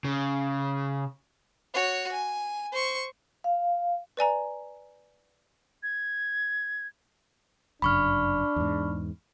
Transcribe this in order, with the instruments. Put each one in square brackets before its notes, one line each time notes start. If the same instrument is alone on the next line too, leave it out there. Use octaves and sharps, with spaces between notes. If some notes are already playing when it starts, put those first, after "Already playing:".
[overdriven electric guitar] C#3
[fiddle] F#4 C#5
G#5
C5 C#6
[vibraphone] F5
[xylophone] B4 D5 G#5 A#5
[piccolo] G#6
[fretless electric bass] G1 F#2 C#3 [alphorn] D4 [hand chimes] B5 C#6 F6
[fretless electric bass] E2 G#2